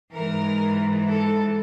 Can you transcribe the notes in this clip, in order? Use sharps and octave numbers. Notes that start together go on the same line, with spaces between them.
G#2 E3 A#4
A4